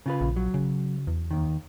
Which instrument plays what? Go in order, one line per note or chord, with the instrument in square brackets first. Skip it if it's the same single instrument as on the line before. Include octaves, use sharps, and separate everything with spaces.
[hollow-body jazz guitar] C#3 F4 B4
[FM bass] A#1
[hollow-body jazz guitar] F#3
[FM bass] C#3
E2
[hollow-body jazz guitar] D#2 D#3